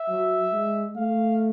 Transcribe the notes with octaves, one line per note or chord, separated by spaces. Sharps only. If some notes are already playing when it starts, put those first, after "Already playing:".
Already playing: E5
F#3
G#3
A3 F5